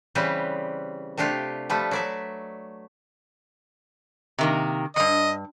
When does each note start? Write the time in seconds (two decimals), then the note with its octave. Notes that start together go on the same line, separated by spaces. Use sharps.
0.15 C#3 E3 G3 C4 G4 B4
1.18 C3 A3 D4 F4 G4
1.70 F3 G3 A3 B4
1.91 F#3 D5 E5
4.39 C3 D#3 A#3
4.96 E2 G2 D#5